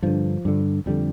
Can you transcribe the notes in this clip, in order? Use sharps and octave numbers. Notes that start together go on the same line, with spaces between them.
G2 D3 F3
G2 D3
F2 D3 G3